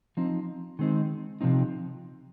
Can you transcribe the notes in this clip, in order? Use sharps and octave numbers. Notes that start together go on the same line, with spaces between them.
F3 C4 D#4
D#3 G#3 C4 D#4
C3 F3 C4 D#4